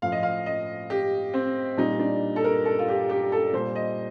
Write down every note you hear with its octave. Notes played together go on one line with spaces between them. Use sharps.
A2 F3 F5
D#5
F5
D#5
G4
C4
A#2 G3 D#4
D4
A4
A#4
A4
F4
G4
G4
A4
A#2 G3 C5
D#5